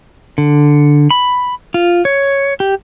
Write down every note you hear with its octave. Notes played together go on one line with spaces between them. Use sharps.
D3
B5
F4
C#5
G4